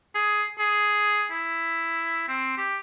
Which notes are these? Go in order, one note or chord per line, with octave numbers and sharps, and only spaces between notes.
G#4
G#4
E4
C4
G4